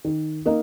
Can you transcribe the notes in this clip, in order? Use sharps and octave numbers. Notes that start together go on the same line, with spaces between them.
D#3
A#3 D#4 A#4 D#5